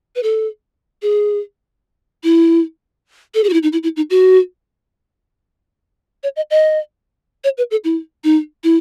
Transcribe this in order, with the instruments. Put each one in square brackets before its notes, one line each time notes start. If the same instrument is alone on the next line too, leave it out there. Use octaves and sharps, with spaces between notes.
[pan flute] B4
A4
G#4
E4
A4
G#4
F#4
E4
D#4
E4
E4
D#4
F#4
C#5
D#5
D#5
C#5
B4
A4
E4
D#4
E4